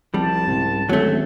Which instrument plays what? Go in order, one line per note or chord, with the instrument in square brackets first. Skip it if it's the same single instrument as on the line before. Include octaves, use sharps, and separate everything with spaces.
[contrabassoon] C2 [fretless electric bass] F3 [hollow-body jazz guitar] G3 [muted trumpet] A5
[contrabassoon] C2 [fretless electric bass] G#2 C#3
[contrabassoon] D1 [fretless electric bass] D#3 G#3 C#4 [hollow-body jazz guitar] F#3 A3